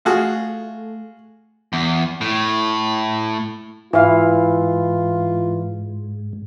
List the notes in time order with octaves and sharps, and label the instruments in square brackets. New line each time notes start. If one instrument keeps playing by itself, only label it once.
[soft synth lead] A3 [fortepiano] F4 F#4 G#4
[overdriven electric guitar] E2
A2
[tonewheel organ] G#2 [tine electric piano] E3 [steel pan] E4 F5 [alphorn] F4